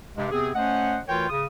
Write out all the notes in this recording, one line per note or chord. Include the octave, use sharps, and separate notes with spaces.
G2 C3 G#3
C3 B3 C4 G#4
A3 C#4 C5 D#5 F#5
D2 E3 F4 A#4 C#5 G5
C#3 D#6